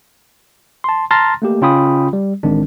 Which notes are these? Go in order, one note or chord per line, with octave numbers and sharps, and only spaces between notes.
A5 C6
A5 A#5 C6 F6 A6 A#6
A3 A#3 G4
C#3 C#4 F4 G5 B5 D#6
G3
A1 D#3 G#3 C4 D4